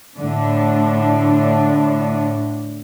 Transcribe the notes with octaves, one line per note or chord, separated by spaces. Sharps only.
A2 D3 D4